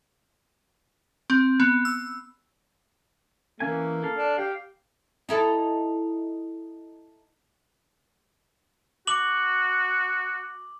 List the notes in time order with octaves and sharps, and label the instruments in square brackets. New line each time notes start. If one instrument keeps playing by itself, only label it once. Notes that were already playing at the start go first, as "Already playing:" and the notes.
[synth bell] C4
B3
E6
[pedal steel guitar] E3 C#4 G#5 [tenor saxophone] A#3
[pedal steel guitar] A4 F5
[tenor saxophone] D4
[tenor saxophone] G4 [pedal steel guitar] F5
[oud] D#4 E4 A4
[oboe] F#4 [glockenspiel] D6 F#7